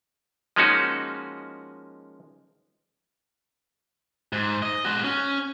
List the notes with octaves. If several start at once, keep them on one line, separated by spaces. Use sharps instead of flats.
F3 G#3 A#3 C#4 D#4 F#4
G#2
D#5
G#3 F#4
C#4